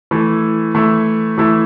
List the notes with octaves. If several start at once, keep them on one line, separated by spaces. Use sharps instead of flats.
E3 A3 E4
E3 A3 E4
E3 A3 E4